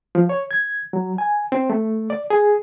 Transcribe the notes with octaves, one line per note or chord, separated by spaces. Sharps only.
F3
C#5
G#6
F#3
G#5
C4
A3
D5
G#4